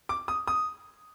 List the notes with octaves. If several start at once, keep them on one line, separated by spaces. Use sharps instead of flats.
D6
D#6
D#6